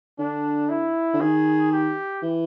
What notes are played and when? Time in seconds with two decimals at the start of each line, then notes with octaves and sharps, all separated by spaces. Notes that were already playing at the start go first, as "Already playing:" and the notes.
0.19 D3 D4
0.69 E4
1.13 D3
1.20 D#3 G#4
1.72 G4
2.22 E3